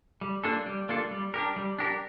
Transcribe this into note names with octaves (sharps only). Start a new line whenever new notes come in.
G3
A#3 D4 F4 A4
G3
A#3 D4 F4 A4
G3
D4 G4 A#4
G3
D4 G4 A#4